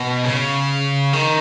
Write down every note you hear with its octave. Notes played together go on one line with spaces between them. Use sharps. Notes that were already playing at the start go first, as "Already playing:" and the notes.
Already playing: B2
C#3
D#3